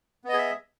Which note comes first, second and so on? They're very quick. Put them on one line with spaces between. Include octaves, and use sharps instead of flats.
B3 D#5 G#4 E5